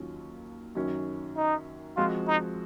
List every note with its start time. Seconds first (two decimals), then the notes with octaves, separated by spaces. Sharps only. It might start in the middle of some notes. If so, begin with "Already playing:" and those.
Already playing: D#2 D#3 F#3 C#4 F4
0.75 F#2 D#3 F#3 C#4
1.37 D#4
1.96 F3 G#3 C4 F4 F#4
2.28 D#4